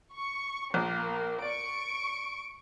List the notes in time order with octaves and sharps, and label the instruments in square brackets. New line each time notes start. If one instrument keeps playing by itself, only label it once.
[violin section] C#6
[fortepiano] A#1 [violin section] A#3
[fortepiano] D5 [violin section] C#6 D7